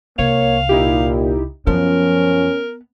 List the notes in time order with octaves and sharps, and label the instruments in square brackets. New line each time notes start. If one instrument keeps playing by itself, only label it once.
[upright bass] C2 [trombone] A#3 [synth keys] C#5 [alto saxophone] F5
[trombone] A#2 [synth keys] D#4 E4 G4
[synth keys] F#2 F3 [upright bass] B3 [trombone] C#4 [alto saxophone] A#4